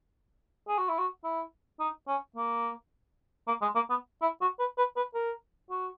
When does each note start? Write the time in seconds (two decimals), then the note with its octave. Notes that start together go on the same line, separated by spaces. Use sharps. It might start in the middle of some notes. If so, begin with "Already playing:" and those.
0.68 G#4
0.78 F#4
0.89 E4
0.98 F#4
1.24 E4
1.80 D#4
2.07 C#4
2.36 A#3
3.47 A#3
3.61 G#3
3.75 A#3
3.90 B3
4.22 E4
4.41 F#4
4.59 B4
4.78 B4
4.96 B4
5.14 A#4
5.70 F#4